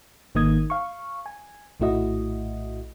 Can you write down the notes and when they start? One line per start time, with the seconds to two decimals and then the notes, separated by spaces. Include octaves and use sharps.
0.35 G#1 D#3 A#3 D#4 D#6 G#6
0.70 F5 C#6
1.26 G#5
1.80 A#1 A2 A3 E4 F#4 D#5